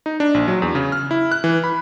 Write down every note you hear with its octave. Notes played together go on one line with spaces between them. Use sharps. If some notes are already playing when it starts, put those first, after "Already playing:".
D#4
D4
A#1
F#3
E2
C#3
F6
E4
F#6
E3
B5